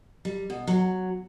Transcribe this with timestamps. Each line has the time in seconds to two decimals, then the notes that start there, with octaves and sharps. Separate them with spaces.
0.25 G3
0.50 B2
0.67 F#3